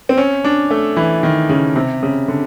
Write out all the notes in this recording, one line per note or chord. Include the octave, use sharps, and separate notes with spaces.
C4
C#4
D4
A3
E3
D#3
C#3
C3
C#3
D3